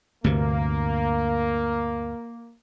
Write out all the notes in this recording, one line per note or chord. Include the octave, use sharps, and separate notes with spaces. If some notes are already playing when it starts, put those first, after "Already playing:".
D2 G2 C3 A#3